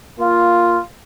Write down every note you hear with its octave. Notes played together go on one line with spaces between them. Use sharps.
A#3 F4